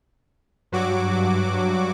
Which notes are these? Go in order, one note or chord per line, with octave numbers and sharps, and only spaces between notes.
G2 F#3 F#4 D6